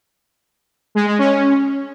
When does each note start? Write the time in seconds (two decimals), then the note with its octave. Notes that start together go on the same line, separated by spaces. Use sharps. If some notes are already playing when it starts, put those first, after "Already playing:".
0.95 G#3
1.07 G#3
1.19 C#4